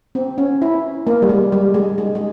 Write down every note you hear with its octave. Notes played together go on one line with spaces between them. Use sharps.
C4
C#4
E4
A#3
G3
G#3
G3
G#3
G#3
G#3